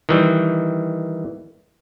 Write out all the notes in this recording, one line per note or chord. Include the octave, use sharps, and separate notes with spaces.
D#3 E3 G3